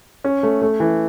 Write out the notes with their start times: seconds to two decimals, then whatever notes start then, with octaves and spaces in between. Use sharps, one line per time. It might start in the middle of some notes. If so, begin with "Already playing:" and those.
0.24 C#4
0.43 A3
0.62 A3
0.80 E3